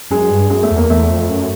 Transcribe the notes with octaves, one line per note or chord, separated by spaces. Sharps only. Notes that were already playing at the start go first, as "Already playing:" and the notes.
F#2 G#3
G2
F#2 G#3
A3
E2
A#3
E2 A3
F2
F#2